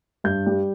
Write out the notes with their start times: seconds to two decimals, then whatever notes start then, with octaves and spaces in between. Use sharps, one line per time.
0.24 G2 G6
0.46 G3